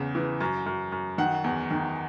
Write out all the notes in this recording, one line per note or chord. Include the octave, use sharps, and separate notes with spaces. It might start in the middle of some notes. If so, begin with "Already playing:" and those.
Already playing: E2 C#3
E3
F#2
F#2
F#2
D#3 F#5
E2
D#3